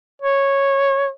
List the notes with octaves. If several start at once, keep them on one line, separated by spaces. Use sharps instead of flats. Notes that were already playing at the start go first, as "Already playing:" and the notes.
C#5